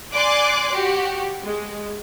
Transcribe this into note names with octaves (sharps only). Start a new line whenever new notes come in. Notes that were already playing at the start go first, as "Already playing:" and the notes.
D5 G#5 C6 D6 F#6
F#4 G4
G#3